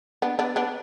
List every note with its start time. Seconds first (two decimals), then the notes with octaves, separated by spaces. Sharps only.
0.22 B3 D4
0.39 B3 D4
0.56 B3 D4